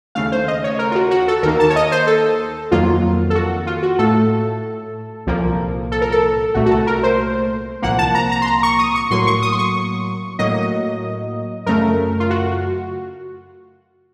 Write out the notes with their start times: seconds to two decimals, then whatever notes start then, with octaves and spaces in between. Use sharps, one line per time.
0.15 D#2 C#3 A3 F5
0.32 C5
0.48 D#5
0.64 C#5
0.79 A#4
0.92 F4
0.95 F#4
1.11 F#4
1.28 A4
1.43 D#2 D#3 A#3 A#4
1.60 A5
1.70 C#5
1.76 D#5
1.92 C5
2.07 A4
2.72 F2 D#3 F#3 A#3 F4
3.30 A4
3.35 F#4
3.67 F4
3.83 F#4
3.99 A2 A3 A4
5.27 C2 A#2 F3 A#3
5.92 A4
6.01 A#4
6.12 A4
6.54 C2 A#2 A3 F#4
6.66 F#4
6.71 A4
6.87 A#4
7.03 C5
7.82 C2 A#2 F3 A#3 F#5
7.99 A5
8.15 A#5
8.32 A#5
8.42 C6
8.47 A#5
8.63 C#6
8.79 D#6
8.95 C#6
9.10 A2 F#3 A#3 C6
9.27 C#6
9.42 D#6
9.52 C6
9.58 C#6
10.39 A2 F#3 A#3 D#5
11.66 F#2 C#3 A3 A#4
12.20 F4
12.30 F#4